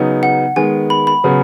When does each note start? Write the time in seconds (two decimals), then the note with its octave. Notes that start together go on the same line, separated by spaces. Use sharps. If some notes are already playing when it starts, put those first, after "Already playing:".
Already playing: C#3 F#3 B3 D#4
0.23 F#5
0.56 D#3 G#3 B3 G#5
0.90 B5
1.07 B5
1.24 C#3 F#3 B3